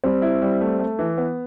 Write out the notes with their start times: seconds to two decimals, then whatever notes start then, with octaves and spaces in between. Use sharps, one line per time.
0.04 G3 C4
0.22 E4
0.42 G3
0.61 A3
0.79 A3
0.99 E3
1.18 B3